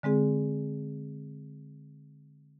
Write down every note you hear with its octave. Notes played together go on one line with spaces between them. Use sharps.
D3 G#3 C4 G#4